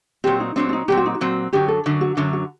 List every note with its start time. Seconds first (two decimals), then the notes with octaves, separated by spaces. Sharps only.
0.24 A#2 F#3 C4 G4
0.40 D#4
0.56 A#2 F#3 C4 D4
0.69 D4
0.73 D#4
0.88 A#2 F#3 C4 G4
0.97 F#4
1.06 D#4
1.14 F#4
1.21 A#2 F#3 C4
1.53 F#2 D3 F#3 G4
1.68 A4
1.86 F#2 D3 F#3
2.01 F#4
2.17 F#2 D3 F#3
2.33 F#4